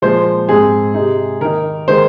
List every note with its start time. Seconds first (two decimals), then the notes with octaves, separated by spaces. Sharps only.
0.02 A#2 F3 G#3 C5
0.48 G#2 G#3 C4 D#4 G#4
0.94 C3 G#3 D#4
1.41 D#3 A#3 D#4 A#4
1.88 D#3 G#3 C5